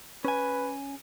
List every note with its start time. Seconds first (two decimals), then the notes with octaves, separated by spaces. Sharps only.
0.25 C#4 B4 G#5